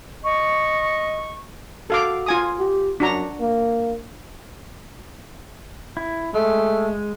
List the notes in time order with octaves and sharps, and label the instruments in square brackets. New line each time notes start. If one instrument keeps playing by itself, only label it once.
[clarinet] D#5 [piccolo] C#6
[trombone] F#4 [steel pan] A4 F5 D6
[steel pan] F4 G#5 D#6
[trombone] G4
[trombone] F#2 [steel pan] D4 F#4 A#5
[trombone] A#3
[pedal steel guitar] E4
[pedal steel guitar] G#3 [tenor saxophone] A3